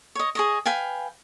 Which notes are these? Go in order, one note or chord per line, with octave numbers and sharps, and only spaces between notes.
C#5 D#5
G#4 C#5 D#5
B4 F5 G5 G#5